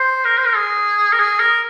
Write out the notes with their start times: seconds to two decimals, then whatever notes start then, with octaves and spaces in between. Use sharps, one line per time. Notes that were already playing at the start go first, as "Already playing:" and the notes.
Already playing: C5
0.25 A#4
0.37 C5
0.46 A#4
0.56 G#4
1.13 A#4
1.19 G#4
1.40 A#4